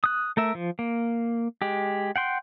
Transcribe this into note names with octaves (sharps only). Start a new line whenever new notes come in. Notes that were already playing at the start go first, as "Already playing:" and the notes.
D#6 F#6
A3 A#4 E5
F3
A#3
G#3 G4
F#5 G5 C6